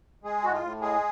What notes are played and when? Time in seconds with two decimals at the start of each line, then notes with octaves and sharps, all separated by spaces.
0.24 G#3 G#4
0.44 A2 F#4
0.53 F4
0.63 A2
0.81 G#3 G#4